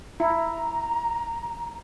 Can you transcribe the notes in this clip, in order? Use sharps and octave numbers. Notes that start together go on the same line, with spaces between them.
E4 A#5